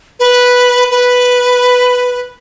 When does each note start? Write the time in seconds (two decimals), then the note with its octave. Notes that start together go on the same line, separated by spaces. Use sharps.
0.20 B4
0.91 B4